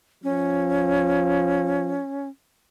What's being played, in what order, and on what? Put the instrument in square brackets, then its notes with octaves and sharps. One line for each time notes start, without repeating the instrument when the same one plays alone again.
[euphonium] F3 [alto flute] C#4